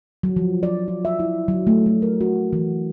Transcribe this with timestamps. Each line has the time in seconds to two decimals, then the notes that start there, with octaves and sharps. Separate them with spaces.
0.23 F#3
0.36 F3
0.63 D5
0.88 F4
1.05 E5
1.19 E4
1.48 F#3
1.67 A3
1.86 A3
2.02 A#4
2.21 F#4
2.53 E3